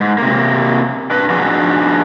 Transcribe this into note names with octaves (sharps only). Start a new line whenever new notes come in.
G#2
C3 A#3
D4 B4
F3 D4 D#4 F#4 G#4